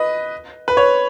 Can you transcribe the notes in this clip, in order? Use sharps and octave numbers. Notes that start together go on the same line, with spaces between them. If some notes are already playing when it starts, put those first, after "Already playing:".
Already playing: B4 D#5
B4
C#5